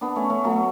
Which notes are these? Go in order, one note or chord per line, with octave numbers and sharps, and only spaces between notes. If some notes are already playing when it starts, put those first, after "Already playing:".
B3 D4
A3 C#4
A3 C#4
F#3 A3